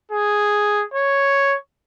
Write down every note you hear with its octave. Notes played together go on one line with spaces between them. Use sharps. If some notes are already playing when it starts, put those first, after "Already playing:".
G#4
C#5